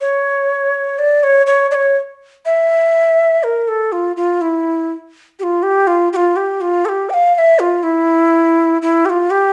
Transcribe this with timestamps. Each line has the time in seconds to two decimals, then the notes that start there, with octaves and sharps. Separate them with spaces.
0.01 C#5
0.99 D5
1.23 C#5
1.47 C#5
1.71 D5
1.74 C#5
2.46 E5
3.43 A#4
3.68 A4
3.92 F4
4.17 F4
4.41 E4
5.39 G4
5.43 F4
5.63 G4
5.87 F4
6.13 G4
6.16 F4
6.36 G4
6.61 F4
6.85 A4
6.89 G4
7.10 G5
7.14 F5
7.35 F5
7.38 E5
7.59 F4
7.83 E4
8.82 E4
9.05 G4
9.09 F4
9.30 G4